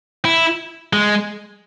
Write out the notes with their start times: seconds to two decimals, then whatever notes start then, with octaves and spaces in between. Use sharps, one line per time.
0.25 E4
0.93 G#3